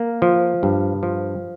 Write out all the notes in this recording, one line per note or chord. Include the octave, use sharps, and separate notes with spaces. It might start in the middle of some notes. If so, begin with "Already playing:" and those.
Already playing: A#3
F3
G2
F3